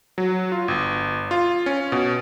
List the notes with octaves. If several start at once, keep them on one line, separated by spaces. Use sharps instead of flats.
F#3
F4
G1
F4
C#4
B2